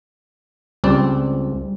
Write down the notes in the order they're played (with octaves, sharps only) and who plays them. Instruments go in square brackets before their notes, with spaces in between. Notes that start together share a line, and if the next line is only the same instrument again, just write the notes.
[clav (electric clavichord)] C#2 C4 D5 [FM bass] G3